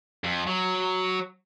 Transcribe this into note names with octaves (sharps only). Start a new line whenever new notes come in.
F2
F#3